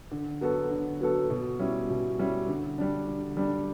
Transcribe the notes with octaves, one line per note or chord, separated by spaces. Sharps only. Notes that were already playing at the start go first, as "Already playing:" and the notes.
D3
F#3 B3 F#4 A4
D3
F#3 B3 F#4 A4
B2
G3 C#4 E4
B2
G3 C#4 E4
D3
G3 D4
D3
G3 D4